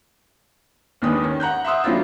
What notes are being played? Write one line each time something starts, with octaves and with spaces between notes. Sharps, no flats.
D#2 D#3 G#3 D4 B4 D#6
D#3 C#4
F#5 A#5 F#6 G6
E5 F#5 C6 D#6 E6
F#3 A3 C4 D4 E4 F4